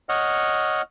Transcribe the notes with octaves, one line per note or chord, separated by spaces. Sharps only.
C#5 D#5 F#5 F6